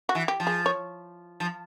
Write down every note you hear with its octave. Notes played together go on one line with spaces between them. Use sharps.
F#4
E3
G4
F3
G#4
C#5
F3